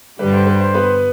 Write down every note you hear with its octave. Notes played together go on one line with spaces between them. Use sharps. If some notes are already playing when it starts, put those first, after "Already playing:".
G2 D3 G3 B4
C5
B4
C5
B3 B4